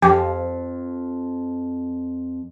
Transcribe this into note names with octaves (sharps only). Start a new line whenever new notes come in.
F2 F3 G4